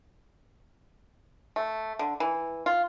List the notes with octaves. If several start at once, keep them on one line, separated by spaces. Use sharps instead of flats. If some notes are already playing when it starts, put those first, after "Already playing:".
A3
D3
E3
F4